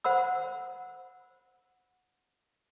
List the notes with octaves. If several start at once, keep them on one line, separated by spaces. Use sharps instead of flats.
C5 F#5 B5 E6